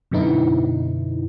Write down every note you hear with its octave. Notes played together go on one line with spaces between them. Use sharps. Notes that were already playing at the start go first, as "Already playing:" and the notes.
F#2 B2 D3 B3 D#4 E4